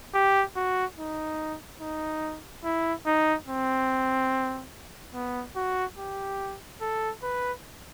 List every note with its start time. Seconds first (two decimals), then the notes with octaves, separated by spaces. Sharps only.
0.14 G4
0.56 F#4
0.98 D#4
1.81 D#4
2.64 E4
3.06 D#4
3.48 C4
5.14 B3
5.56 F#4
5.98 G4
6.82 A4
7.23 B4